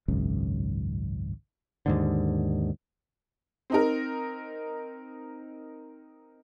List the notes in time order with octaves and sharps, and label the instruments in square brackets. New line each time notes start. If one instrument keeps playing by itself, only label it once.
[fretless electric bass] G#1 C#2 F#2
[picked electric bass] D#2 G#2 D3
[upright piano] C4 D#4 A#4